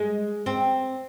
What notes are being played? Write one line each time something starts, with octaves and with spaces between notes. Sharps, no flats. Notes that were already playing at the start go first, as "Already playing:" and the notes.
Already playing: G#3
C4